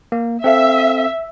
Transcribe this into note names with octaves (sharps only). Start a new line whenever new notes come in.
A#3
C4 A4 E5 F5